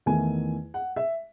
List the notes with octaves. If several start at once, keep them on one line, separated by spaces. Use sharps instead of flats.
E2 D#3 A3 G#5
F#5
E5